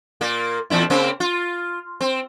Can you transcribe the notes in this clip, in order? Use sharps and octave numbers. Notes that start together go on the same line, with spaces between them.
A#2 A#3
E2 A#2 E4
C#3 A#3 C4
F4
C4